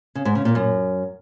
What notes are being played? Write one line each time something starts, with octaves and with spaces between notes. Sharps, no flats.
C#3
G#2
C#3
A#2
F#2